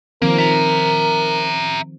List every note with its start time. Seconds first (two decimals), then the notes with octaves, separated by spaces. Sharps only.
0.22 D#3 F3 A#3 C4 A#4
0.38 E5 A#5